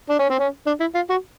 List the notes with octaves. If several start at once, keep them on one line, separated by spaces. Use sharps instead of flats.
D4
C#4
C4
C#4
D4
E4
F4
F#4